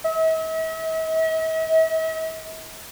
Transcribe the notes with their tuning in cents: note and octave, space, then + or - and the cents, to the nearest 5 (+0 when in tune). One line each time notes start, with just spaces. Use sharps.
E5 -45